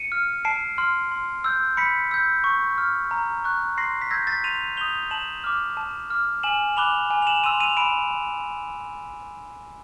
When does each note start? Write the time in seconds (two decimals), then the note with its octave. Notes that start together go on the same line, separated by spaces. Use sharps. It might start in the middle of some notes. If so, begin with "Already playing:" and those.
Already playing: C#7 D#7
0.12 F6
0.45 A5 C7 D7
0.78 C6 F6
1.11 C6
1.44 E6 G6
1.77 B5 B6 C#7
2.11 E6 G6
2.44 C#6
2.78 F6
3.11 A#5
3.44 C#6 F#6
3.78 C6 A#6 C7
4.02 B6
4.11 E6 G6 G#6 A#6
4.27 A6 B6
4.44 C6 D#7 F7
4.77 D#6 G6 F7 G7
5.11 A5 E7 F#7
5.44 D6 F6
5.77 A5
6.10 D6 F6
6.43 G#5 E7 F#7
6.77 B5 D6 F#6 F7 G7
7.10 G#5
7.22 F7
7.27 E7 F#7
7.44 C6 E6 D#7 F7
7.60 D#7 F7
7.77 B5 D7 E7